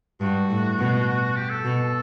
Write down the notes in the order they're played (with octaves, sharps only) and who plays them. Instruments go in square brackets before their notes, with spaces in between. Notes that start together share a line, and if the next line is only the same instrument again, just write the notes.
[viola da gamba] G2 [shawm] F#4
[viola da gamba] A2
B2
[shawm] G4
A4
[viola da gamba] B2